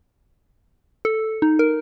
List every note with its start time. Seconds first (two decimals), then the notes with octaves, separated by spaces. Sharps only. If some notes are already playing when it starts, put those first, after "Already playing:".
1.05 A4
1.42 D#4
1.59 A#4